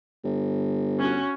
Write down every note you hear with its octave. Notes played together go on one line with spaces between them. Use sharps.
G1
C#4 F#4